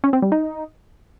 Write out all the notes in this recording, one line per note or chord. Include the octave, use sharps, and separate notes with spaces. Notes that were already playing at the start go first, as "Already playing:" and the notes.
C#4
C4
G3
D#4